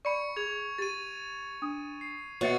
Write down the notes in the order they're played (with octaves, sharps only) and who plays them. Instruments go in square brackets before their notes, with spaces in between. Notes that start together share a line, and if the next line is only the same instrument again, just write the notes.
[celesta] D5 B5 [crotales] C#6 C#7
[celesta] G#4 [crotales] G#6 F7
[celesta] G4 [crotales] A6 D#7
[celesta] D4 D#6
[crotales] C7
[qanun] B2 [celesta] C#5 E5 F#5 [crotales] C#6 A6 C#7